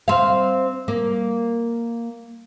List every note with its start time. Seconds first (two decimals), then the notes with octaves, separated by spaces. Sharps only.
0.08 C4 F5
0.88 A#3